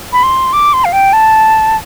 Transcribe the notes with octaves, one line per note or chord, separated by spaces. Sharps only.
B5
C6
D6
C6
F5
G5
A5